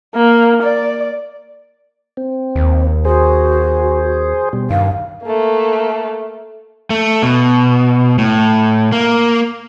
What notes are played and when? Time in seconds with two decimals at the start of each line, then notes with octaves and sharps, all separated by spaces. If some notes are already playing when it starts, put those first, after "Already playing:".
0.15 A#3
0.63 D5
2.17 C4
2.56 D#2
3.05 F#4 G#4 C5
4.53 B2 G3
4.70 G2 D#3 F5
5.23 A3 A#3
6.90 A3
7.23 B2
8.18 A2
8.92 A#3